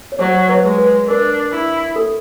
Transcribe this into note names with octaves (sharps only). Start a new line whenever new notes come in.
C#5
F#3 C5 D5
B4 C#5
G#3
B4
D4 A#4
E4
A4